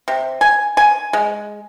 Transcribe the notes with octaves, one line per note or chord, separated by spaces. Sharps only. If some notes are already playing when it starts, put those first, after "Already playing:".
C3
G#5
G#5
G#3